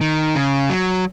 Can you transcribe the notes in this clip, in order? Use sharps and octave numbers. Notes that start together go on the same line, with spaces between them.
D#3
C#3
F#3